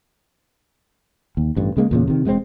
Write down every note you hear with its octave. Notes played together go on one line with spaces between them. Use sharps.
D#2
A1 G2
C#3 G#3 A#3
E2 A#2 C#3
C3 D#3
E1 G#3 A3 C4